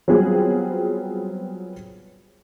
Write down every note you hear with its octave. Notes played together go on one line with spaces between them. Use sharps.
F#3 G3 B3 C4 F4 G#4